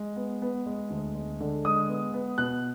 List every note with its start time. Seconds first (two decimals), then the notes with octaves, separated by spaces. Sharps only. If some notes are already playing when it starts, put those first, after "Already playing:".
Already playing: G#3
0.16 B3
0.42 B3
0.66 G#3
0.90 D2
1.15 G#3
1.40 D3
1.65 G#3 D#6
1.89 B3
2.14 B3
2.38 B2 F#6